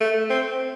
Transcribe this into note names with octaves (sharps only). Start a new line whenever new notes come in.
A3
C4